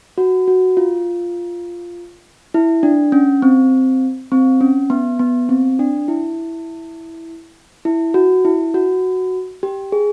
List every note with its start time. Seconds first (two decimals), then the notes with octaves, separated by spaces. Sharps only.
0.18 F#4
0.48 F#4
0.77 F4
2.54 E4
2.83 D4
3.12 C#4
3.42 C4
4.32 C4
4.61 C#4
4.90 B3
5.19 B3
5.49 C4
5.79 D4
6.08 E4
7.85 E4
8.14 F#4
8.45 E4
8.74 F#4
9.63 G4
9.92 G#4